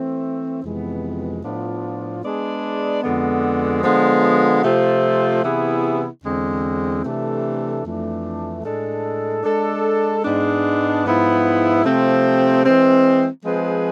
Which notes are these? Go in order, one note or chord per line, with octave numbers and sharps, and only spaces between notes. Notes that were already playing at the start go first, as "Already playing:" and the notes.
Already playing: E3 A3 C4
F2 C3 E3 G#3 B3
A2 F3 B3 D4 F4
G#3 B3 D4 G#4 D5
F2 D3 G#3 B3
D3 F3 G#3 B3
C3 F3 A3 C4 F4
C3 E3 B3 E4 G#4
E2 D3 G#3 C4
C3 E3 A3 D4 A4
F2 E3 A3 D4
A2 G#3 D4 A4
G#3 D4 A4
G#2 G#3 B3 D4
G#2 F3 B3 E4
C3 F3 A3 C4
E3 G#3 C4
F3 G#3 C4 G#4 B4